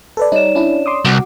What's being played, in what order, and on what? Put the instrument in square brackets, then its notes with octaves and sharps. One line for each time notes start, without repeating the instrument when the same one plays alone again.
[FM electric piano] A4 B4 D5
[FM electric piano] G3 D#4 [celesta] C#5 D5 E7
[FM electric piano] C#4 D4 E4
C6 D6 D#6
[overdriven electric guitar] C2 [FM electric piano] F#4 D6